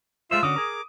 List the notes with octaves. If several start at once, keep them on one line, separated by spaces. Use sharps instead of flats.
G#3 A3 F4 C5 E5 E6
D3 C#4 F#4 D6 D#6
G#4 A#4